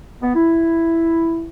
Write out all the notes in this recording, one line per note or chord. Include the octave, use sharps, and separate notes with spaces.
B3
E4